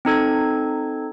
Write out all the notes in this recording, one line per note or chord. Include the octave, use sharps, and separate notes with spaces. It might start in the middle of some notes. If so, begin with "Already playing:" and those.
C4 D#4 A4 G#6